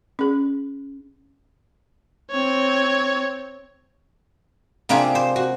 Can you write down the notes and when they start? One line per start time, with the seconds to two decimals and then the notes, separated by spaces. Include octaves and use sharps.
0.19 C#4 G#4
2.31 C4 C#5
4.89 C3 A#3 D4 F4 G4 G#4
5.15 C5
5.36 F#4